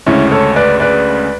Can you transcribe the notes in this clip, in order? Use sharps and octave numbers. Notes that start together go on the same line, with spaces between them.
D2 C#3 G#3 C#4 E4
A4 C#5
B4 D5
B4 D5